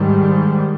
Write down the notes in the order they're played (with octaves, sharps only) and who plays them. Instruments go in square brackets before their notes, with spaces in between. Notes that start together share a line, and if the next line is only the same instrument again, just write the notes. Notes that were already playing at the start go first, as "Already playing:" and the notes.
Already playing: [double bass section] G#2 D#3 G3